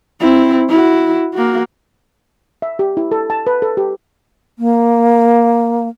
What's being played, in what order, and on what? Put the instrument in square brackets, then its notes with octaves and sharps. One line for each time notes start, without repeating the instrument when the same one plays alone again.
[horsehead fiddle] C4 E4
E4 F#4
A#3 F#4
[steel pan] E5
G4
E4
A4
A5
B4
A4
G4
[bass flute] A#3